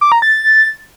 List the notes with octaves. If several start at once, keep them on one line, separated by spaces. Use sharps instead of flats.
D6
A#5
A6